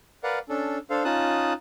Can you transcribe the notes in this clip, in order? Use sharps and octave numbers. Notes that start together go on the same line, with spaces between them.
A#4 B4 D5 F5 F#5
C#4 D4 A4
D4 A4 C5 F5
C#4 D#4 F4 A5 D#6 F#6